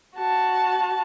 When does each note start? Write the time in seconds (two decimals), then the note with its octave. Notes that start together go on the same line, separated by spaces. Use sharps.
0.17 F#4 A5